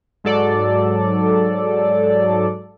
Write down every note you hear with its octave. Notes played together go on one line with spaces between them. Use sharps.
G#2 F#3 A4 D5